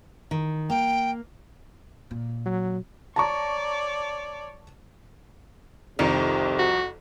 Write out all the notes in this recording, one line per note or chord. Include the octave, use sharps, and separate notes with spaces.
D#3
A#3 G5
A#2
F#3
C#5 D5 A5 A#5 C#6
C2 F2 C3 D#3
F#4